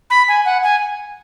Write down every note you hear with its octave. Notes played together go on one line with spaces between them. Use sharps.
B5
G#5
F#5
G#5